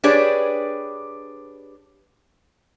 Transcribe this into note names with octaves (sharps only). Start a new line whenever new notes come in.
D4 G4 G#4 B4 C#5 D5